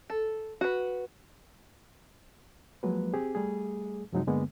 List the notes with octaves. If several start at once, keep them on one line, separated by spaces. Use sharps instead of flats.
A4
F#4 B4
F3 F#3 G#3 A#3 B4
C4 G4 G#4
G3 A3 G#4
F#2 C3 F3 F#3 G#3 D#4
G2 D3 G#3 A#3 B3